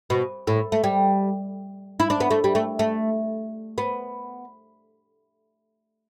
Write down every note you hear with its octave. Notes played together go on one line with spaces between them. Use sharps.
B2
A2
A3
G3
E4
D4
B3
A3
G3
A3
A3
B3